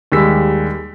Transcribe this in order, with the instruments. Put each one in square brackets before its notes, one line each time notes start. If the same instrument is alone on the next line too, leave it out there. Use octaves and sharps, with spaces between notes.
[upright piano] D#2 G3 G#3 E6 B6